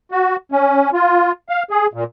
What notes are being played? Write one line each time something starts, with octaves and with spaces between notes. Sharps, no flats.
F#4
C#4
F4
F5
G#4
A#2